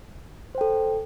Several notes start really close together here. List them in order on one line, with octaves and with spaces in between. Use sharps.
C5 G5 A4